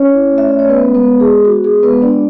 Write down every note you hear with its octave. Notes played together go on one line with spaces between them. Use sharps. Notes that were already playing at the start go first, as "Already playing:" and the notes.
Already playing: C#4 C#5
E4
A3
E5
A3 D5
C#5
B3 B4
G#3
B3 B4
G#3
G#4
F#4
B3 F#4
G#3 G#4
G#3 B3 B4
D4 F#4 D5